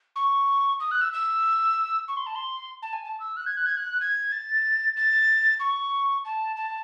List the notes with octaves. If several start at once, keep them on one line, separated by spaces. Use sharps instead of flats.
C#6
D#6
F#6
E6
E6
C#6
C6
A5
C6
A5
G#5
A5
E6
F#6
G#6
F#6
G#6
F#6
G#6
A6
A6
C#6
A5
A5